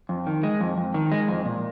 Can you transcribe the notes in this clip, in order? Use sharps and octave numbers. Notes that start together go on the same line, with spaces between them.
F2
D#3
G#3
F2
F2
D#3
G#3
F2
A#2